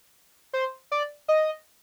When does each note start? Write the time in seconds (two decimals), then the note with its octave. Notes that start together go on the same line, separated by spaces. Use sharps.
0.53 C5
0.92 D5
1.28 D#5